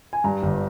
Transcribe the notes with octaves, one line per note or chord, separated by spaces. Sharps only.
G#5
G2 A#5
G1